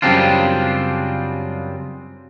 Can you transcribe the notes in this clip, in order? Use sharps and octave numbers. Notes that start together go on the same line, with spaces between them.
F#2 C#3 G3 C4 D4 F4